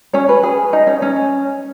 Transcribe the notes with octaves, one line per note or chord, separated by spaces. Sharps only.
C#4 C#5
B4
G#4
D#4
C#4
C#4